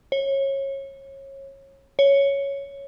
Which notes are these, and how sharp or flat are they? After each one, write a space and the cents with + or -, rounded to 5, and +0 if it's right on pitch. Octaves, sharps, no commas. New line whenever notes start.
C#5 -25
C#5 +5